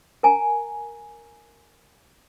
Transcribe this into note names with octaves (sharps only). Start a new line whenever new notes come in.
A#4 G#5 A#5